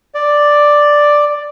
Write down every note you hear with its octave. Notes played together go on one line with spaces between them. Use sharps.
D5